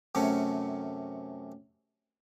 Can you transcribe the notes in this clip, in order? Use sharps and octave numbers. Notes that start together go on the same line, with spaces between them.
F#2 C3 A3 C#4